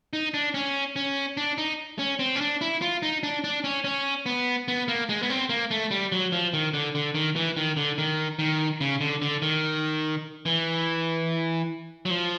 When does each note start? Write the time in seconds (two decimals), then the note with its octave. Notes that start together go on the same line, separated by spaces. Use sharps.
0.13 D#4
0.34 D4
0.54 C#4
0.96 C#4
1.37 D4
1.58 D#4
1.99 C#4
2.19 C4
2.36 C#4
2.41 D4
2.61 E4
2.82 F4
3.03 D#4
3.23 D4
3.44 D4
3.64 C#4
3.84 C#4
4.26 B3
4.68 B3
4.88 A#3
5.09 G#3
5.23 B3
5.30 C4
5.49 A#3
5.71 A3
5.91 G3
6.12 F#3
6.32 F3
6.53 D#3
6.74 D3
6.95 D3
7.15 D#3
7.36 E3
7.57 D#3
7.77 D3
7.98 D#3
8.39 D#3
8.81 C#3
9.01 D3
9.22 D3
9.42 D#3
10.46 E3
12.05 F#3
12.10 F3